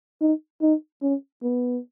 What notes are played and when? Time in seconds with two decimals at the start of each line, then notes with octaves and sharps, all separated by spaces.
0.21 D#4
0.62 D#4
1.02 C#4
1.43 B3